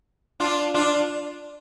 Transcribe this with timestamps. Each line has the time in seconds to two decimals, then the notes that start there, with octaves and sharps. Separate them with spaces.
0.40 D4 F4
0.74 D4 F4